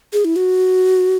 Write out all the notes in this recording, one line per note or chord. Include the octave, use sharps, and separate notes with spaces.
G#4
E4
F#4